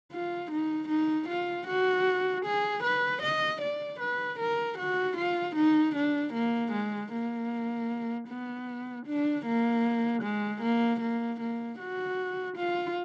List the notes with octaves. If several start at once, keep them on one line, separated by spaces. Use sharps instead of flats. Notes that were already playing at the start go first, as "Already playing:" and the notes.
F4
D#4
D#4
F4
F#4
G#4
B4
D#5
D5
B4
A#4
F#4
F4
D#4
D4
A#3
G#3
A#3
B3
D4
A#3
G#3
A#3
A#3
A#3
F#4
F4